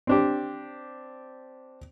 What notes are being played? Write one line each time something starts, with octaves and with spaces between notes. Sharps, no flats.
C4 D4 G4